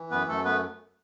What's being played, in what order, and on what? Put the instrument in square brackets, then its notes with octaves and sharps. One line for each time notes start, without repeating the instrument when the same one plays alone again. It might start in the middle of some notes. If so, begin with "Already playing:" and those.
Already playing: [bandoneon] E3
F#2 B3 B4
F#2 A3 A4
A3 B3 B4